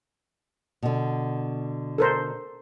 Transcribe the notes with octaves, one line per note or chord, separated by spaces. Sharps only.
B2 D3
A4 A#4 C5